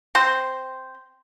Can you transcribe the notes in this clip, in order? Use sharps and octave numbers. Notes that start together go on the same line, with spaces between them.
C4 C5